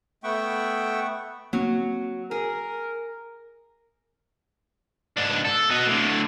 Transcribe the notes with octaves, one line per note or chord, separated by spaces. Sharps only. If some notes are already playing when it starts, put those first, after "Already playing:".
A3 B3 E5 F#5 G5 C#6
F#3 A#3 C4
G#4 A#4
G#2 D4
A4
F#4 D#5
A2 D3